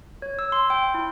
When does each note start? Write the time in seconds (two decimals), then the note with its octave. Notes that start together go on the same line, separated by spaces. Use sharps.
0.22 C#5
0.39 E6
0.52 C6
0.70 G5
0.94 E4